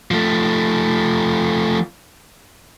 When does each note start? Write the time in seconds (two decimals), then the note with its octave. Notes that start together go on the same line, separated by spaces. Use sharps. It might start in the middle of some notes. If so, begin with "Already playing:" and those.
0.11 F3 A3